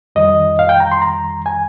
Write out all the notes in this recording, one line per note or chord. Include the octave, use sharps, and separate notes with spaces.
F2 D#3 G3 D#5
F5
G5
A#5
C6
A#5
G#5